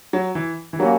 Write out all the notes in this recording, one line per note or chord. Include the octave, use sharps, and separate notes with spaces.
F#3
E3
E3
A#2 F#3 G3 A#3 C#4